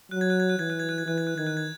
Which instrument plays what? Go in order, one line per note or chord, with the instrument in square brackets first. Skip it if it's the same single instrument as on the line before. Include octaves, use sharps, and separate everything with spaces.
[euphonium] F#3 [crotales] F#6
[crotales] G#6
F#6
G#6
F#6
[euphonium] E3 [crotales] G#6
[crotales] F#6
G#6
F#6
G#6
[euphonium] E3 [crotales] F#6
[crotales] G#6
F#6
[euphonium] D#3 [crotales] G#6
[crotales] F#6
G#6